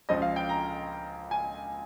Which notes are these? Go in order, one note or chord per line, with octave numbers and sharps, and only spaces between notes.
C#2 C#3 F3 D#5
F5
G5
A#5
G#5